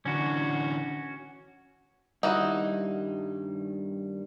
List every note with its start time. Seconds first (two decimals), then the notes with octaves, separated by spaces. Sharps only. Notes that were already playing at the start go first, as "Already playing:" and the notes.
0.05 D3 E3 C#4 F#4
2.23 G2 D#3 G3 D#4 E4 F#4